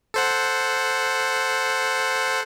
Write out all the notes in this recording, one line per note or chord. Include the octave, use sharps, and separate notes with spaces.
A4 C5 F#5